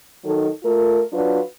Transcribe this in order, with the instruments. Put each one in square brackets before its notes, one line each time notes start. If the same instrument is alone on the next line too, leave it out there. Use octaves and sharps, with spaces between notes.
[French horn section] D#3 F#3 D#4 A4
A3 F4 A#4
F#3 D4 F4 F#4 B4